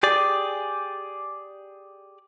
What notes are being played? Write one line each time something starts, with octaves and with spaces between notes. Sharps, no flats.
G4 G#4 D5